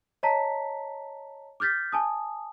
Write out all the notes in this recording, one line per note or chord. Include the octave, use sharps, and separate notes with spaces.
C#5 D#5 A5 A#5 B6
D6 F6 G6 A6 B6
G#5 A5 D#6